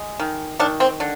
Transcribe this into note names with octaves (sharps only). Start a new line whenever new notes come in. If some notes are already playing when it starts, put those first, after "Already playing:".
Already playing: G#3
D#3
D#3 D4
C4
D3